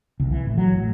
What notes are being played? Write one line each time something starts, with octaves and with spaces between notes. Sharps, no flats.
C2
E3
A1
F#3
A2